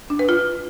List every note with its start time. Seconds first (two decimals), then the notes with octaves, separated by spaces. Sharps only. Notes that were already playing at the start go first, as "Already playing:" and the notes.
0.10 D4
0.19 B4
0.29 F4